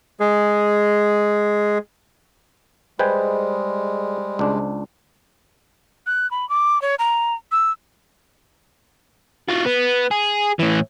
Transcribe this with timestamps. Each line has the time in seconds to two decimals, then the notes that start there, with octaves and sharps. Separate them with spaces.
0.20 G#3 G#4
2.99 G3 G#3 G#4 B4 C5 D#5 G5 G#5
4.39 C#2 D4
6.07 F#6
6.31 B5
6.49 D6
6.82 C#5
6.99 A#5
7.52 E6
9.48 F4 F#4
9.66 B3
10.11 G#4
10.59 A2 E3